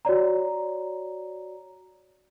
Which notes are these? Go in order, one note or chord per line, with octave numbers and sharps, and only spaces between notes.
F#4 C#5 D5 A#5